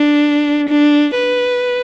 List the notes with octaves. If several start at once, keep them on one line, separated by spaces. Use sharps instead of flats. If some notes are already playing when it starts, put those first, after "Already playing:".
Already playing: D4
D4
B4